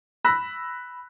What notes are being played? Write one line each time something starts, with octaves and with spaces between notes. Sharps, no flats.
B5 E6 F#6 A#6 B6